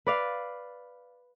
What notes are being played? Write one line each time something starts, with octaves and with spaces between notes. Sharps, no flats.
B4 D5 F5